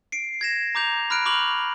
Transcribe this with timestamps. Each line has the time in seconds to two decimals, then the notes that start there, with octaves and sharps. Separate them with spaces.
0.12 C7 D7
0.41 G#6 A#6 E7
0.75 A#5 D6 G6 F7
1.10 B5 F6 F#6 D7
1.25 B5 C#6 D6 F7 F#7